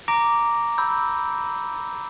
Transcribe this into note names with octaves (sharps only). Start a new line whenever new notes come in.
A#5 D6 A#6 D7
B5 E6 G6